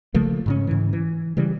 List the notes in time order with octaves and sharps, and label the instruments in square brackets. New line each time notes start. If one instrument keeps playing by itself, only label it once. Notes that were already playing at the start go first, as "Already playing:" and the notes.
[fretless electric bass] C#3 F3 A3 A#3
G#2 C#3 C#4
G#2 C#3 E3
E3
C#3 E3 G3